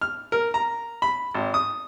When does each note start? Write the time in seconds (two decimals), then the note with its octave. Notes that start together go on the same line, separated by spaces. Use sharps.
0.01 F6
0.32 A#4
0.54 A#5
1.02 B5
1.34 G#1
1.54 D#6